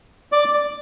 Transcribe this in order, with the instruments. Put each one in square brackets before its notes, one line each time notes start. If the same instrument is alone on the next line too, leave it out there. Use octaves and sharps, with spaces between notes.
[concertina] D5 D6